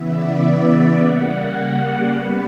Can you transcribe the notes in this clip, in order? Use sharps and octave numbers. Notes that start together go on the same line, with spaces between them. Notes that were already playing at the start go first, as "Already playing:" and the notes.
Already playing: C#3 E3 B3 E5
D5
C#3 G3 A#3 F#5
D5
C#3 G3 B3 B4